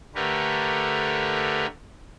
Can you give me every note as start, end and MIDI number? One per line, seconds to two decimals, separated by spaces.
0.15 1.67 50
0.15 1.67 57
0.15 1.67 67
0.15 1.67 70
0.15 1.67 71
0.15 1.67 73